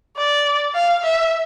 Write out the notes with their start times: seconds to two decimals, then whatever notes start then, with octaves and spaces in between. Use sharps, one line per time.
0.17 D5
0.74 F5
1.04 E5